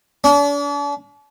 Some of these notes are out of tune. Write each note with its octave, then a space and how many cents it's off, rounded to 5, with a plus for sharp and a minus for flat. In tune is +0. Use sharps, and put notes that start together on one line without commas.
D4 -40